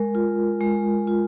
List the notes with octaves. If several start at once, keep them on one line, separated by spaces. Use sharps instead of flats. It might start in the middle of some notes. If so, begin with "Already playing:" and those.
Already playing: G#3 A#4
F4
G#3
F4